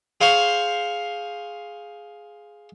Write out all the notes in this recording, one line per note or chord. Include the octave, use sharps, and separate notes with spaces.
G#4 C5 F5 C#6